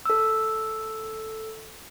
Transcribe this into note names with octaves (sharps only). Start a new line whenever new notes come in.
A4 E6